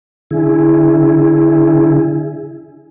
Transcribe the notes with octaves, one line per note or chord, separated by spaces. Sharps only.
D3 E4 G#4